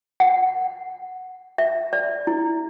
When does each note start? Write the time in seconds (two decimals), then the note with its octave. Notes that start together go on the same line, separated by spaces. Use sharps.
0.20 F#5
1.58 E5
1.93 D5
2.27 E4